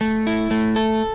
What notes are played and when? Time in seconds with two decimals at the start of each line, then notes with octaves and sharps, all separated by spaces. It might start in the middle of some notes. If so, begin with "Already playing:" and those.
0.01 A3
0.27 E4
0.51 A3
0.76 A4